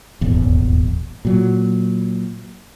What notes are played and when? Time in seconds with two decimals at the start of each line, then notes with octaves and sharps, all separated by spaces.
0.21 D#1 G#1 E2
1.25 A#2 F#3